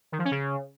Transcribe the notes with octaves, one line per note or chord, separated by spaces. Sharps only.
D#3
F3
C#4
C#3